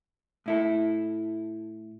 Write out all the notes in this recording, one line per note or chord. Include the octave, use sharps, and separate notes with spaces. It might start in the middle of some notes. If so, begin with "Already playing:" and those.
A2 E4 A4